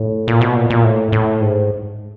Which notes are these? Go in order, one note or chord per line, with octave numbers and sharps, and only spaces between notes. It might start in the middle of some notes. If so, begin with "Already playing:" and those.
Already playing: A2
A#2
B2
A#2
A#2
A2
A2
G#2